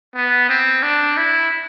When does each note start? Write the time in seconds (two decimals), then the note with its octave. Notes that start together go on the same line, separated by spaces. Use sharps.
0.15 B3
0.49 C4
0.83 D4
1.17 E4